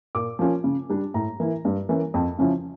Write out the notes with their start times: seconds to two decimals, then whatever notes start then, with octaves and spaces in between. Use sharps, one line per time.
0.15 A#2 D6
0.39 F3 A#3 C#4 F4
0.64 C#3
0.90 G3 D4
1.14 A2 A#5
1.40 E3 A#3 E4
1.65 G2
1.89 E3 A#3 C#4
2.14 F2
2.39 C#3 F3 C#4 E4